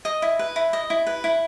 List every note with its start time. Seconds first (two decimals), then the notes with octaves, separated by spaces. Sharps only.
0.05 D#5 D#6
0.22 E4
0.39 B4
0.56 E4
0.73 D#5
0.90 E4
1.07 B4
1.24 E4